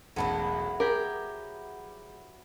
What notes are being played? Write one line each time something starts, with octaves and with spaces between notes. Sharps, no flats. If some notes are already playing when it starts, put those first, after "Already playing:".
E1 A1 F#3 B3 E4 A5
G4 G#4 A#4 D6